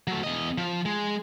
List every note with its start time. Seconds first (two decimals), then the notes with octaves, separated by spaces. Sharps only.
0.07 F#3 A3
0.24 E2 D#5
0.58 F3
0.86 G#3